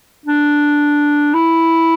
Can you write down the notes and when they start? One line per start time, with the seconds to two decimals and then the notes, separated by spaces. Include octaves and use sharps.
0.26 D4
1.34 E4